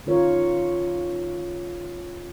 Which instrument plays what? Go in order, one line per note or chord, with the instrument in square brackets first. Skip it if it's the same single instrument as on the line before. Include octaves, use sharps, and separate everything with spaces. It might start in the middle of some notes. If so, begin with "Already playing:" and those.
[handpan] D#3 C#4 F4 A#4 C#5